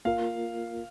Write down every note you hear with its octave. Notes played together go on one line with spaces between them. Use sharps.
A#3 F4 A#4 F5